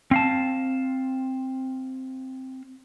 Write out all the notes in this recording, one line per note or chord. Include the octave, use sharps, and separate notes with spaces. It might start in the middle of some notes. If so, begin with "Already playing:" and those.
C4 F5 A5